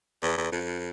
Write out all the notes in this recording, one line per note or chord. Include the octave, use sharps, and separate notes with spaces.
E2
E2
F2